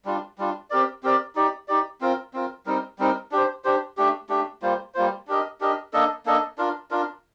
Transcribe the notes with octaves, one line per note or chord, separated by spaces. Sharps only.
G3 D4 F4
G3 D4 F4
C4 G4 A#4 D5
C4 G4 A#4 D5
D#4 G4 D5
D#4 G4 D5
C4 F4 A#4
C4 F4 A#4
G3 C4 D#4 A#4
G3 C4 D#4 A#4
D4 G4 C5
D4 G4 C5
A3 D4 G4
A3 D4 G4
G3 A#3 F4 C5
G3 A#3 F4 C5
D4 G4 A#4 D#5
D4 G4 A#4 D#5
A#3 D4 A4 D#5
A#3 D4 A4 D#5
D4 F4 A#4
D4 F4 A#4